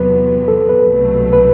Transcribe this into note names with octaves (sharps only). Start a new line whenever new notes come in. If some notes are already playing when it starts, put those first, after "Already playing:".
Already playing: E2 C3 F#3 B3 B4
A4
B4
C2 B2 F#3 A3
B4